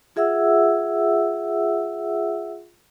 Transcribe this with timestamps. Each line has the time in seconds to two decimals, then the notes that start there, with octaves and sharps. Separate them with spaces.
0.16 F4 G#4 E5 F#5 E6